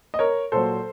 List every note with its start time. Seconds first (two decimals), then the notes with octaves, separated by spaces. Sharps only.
0.14 D#5
0.19 A#4 C#5
0.52 A#2 F#3 A4 C5